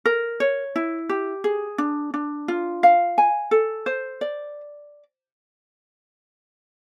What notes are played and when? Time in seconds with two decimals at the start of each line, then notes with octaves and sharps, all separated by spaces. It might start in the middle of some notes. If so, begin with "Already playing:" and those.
0.05 A#4
0.40 C#5
0.76 E4
1.09 G4
1.44 G#4
1.78 D4
2.14 D4
2.48 F4
2.83 F5
3.18 G#5
3.51 A4
3.86 C5
4.21 D5